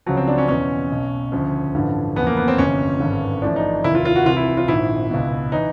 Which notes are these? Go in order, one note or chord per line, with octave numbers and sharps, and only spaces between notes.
C#2 C#3 F3 F#3
C4
D4
C#4
E2 B2 C#4
B1 B2
D2 C#3 F3
A1 G2 D3 F3
E2 C#3 F3 B3
A#3
B3
C4
G1 F2 C3 C#4
G#1 G2 D3
A1 A2 F3 D4
D#4
F1 D#2 D#3 E4
F4
F4
F#4
C2 C3 E3 F4
E4
F4
A#1 G#2 D#3 E4
C#2 B2
E3 D#4